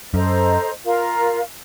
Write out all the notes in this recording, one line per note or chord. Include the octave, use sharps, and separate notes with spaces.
F#2 A4 C5 D#5 A#5
F4 A#4 F5 A#5